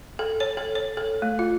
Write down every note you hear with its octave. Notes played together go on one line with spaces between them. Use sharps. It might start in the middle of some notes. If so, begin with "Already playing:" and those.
A4
C#5
A4
C#5
A4
A3
F4